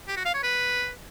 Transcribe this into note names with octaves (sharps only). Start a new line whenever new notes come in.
G4
F#4
F5
C#5
B4